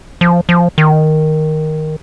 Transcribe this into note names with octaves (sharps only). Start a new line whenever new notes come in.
F3
F3
D#3